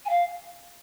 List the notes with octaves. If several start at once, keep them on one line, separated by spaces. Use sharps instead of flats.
G#5
F5